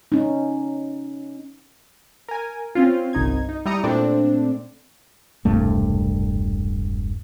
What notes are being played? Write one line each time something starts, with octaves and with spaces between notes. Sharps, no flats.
C#4 D#4
A#4 G#5
C4 C#4 F4
G1 C2 D#4 G#6
D#4
G3 E4 G5 A#5 D#6 C#7
A#2 A3 C4 D4
E1 C2 G2 A3